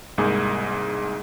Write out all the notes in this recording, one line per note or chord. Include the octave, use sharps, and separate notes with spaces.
C2 G#2 A#3 G#4